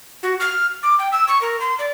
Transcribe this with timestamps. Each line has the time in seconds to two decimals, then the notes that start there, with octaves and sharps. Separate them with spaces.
0.23 F#4
0.40 F6
0.83 D6
0.99 G5
1.12 E6
1.28 C#6
1.42 A#4
1.60 C6
1.79 D5